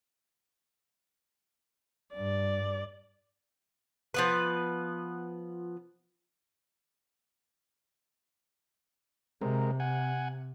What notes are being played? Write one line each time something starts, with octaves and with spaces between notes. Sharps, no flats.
G2 D5
F3 B3 B4
C3 G#3 C4 A#4
F#5 G#5